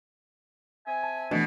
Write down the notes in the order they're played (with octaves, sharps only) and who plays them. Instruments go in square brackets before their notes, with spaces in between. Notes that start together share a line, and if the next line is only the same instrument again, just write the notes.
[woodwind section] C4 E5 G#5
[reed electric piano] A5
[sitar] B2 [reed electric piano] E3 A3 D4